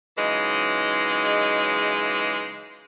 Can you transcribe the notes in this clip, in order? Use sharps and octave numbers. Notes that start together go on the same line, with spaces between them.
C#3 E3 F#3 G#3 D#4